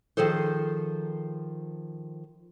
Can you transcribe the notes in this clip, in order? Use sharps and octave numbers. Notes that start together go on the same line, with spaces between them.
D#3 F3 G#4 A4 C5